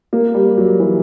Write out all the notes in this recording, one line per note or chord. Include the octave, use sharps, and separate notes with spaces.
A#3
G3
F#3
E3